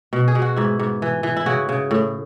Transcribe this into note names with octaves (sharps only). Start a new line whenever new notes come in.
B2
G#4
B2
F#4
G#2 E4
G#2
E3
E3
E4
C#3 F#4
C#3
A2